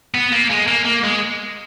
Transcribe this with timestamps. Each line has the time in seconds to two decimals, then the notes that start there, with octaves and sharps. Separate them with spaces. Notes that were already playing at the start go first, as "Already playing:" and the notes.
0.14 B3
0.32 A#3
0.50 G#3
0.68 A#3
0.85 A#3
1.04 G#3